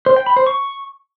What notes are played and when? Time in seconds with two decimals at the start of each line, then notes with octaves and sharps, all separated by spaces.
0.06 C5
0.16 G5
0.26 B5
0.36 C5
0.47 C#6